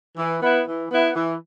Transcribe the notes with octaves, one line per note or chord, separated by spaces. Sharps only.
E3
B3 E4
E3
B3 E4
E3